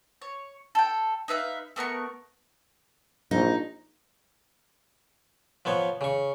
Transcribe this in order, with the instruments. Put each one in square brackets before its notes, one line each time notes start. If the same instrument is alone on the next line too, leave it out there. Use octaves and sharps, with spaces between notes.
[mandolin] C#5
A4 G5
D#4 B4 E5 F5
A3 B3 A#4 C#6
[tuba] A#1 [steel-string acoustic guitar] D#4
[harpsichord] F3 B3 C#5
C#3 C#6